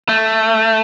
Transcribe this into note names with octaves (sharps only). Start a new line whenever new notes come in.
A3